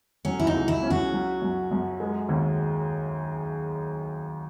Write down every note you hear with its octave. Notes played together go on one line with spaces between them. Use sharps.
F#3 C#4
E4
D#4
C#2
E4
C#4
F#4
F#3
F#2
F#2
G#3
D#2